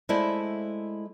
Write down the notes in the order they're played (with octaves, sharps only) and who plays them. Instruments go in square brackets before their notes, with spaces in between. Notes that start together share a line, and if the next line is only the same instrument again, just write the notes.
[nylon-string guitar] G#3 A3 E4 C5 D5 E5